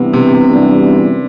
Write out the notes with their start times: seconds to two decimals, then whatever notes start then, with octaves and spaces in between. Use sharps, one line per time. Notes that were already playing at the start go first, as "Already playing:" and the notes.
Already playing: G2 C3 E3 B3
0.13 C3
0.47 F#2 E3 G3 B3 D4